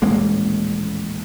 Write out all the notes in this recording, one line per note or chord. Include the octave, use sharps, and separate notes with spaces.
D#1 A1 G#3 A#3